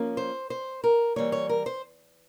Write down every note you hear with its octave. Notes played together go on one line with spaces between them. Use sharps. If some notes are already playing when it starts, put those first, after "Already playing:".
Already playing: F3 A#3 C#4
C5
C5
A#4
E3 G3 A#3 C#5
C#5
A#4
C5